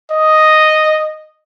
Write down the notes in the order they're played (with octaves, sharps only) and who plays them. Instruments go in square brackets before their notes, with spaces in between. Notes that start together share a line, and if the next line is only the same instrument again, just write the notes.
[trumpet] D#5